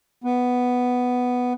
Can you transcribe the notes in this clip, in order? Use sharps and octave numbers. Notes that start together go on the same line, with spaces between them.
B3